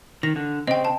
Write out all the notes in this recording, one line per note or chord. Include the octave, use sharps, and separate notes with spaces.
D#3 A#6
D3
C#3 C4 D#5 G5
G5 A5